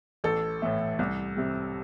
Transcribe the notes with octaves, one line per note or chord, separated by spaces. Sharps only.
A1 A4
A2 E3 A3
C2
C3 G3